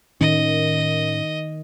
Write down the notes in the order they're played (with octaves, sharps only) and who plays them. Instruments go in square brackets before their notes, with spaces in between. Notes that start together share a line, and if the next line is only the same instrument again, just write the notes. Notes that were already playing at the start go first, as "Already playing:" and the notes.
[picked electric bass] A2 C#4 [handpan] D#3 [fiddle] D#5